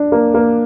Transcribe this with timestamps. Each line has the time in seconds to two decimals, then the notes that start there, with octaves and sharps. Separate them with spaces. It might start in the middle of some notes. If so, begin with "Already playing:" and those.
Already playing: D4
0.12 A#3
0.34 A#3